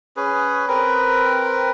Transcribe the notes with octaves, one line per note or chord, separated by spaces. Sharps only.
C#4 G#4 B4
C4 A#4 B4